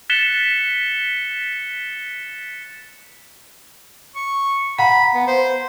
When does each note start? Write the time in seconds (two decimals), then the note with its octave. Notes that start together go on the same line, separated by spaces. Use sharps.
0.10 F#6 A6 B6 C#7 E7 G7
4.15 C#6
4.78 F5 F#5 A#5 B5
5.14 B3
5.27 C5